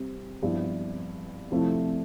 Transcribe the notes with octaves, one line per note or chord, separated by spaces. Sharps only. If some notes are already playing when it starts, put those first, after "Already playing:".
Already playing: C3 G3 C4
G2 F3 B3 E4
F2 C3 F3 A3 E4